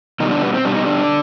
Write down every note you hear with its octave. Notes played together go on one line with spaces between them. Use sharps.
B2 D#3 G3 D#4
D3 D4
B3
C4
B2 G3 D4
D#4
D3 D4